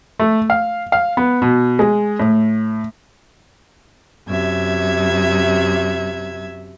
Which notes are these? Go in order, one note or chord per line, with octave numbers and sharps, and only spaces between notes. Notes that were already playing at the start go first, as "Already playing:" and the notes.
A3
F5
F5
B3
B2
G#3
A2
F#2 C3 E5 G#6